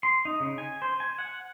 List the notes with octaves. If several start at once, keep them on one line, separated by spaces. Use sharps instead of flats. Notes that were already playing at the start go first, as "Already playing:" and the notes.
C6
D#4
C#3
G#5
C5
G#5
F#5